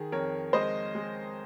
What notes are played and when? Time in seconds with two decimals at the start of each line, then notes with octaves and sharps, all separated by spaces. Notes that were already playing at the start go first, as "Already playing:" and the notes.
Already playing: D#3 G#4
0.12 F2 A#4 C#5
0.53 G#3 C5 D#5
0.95 G#3